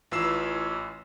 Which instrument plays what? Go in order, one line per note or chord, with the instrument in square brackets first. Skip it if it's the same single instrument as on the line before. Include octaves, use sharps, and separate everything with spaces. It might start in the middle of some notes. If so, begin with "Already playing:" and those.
[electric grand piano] A1 E3 F4 E6 C7 E7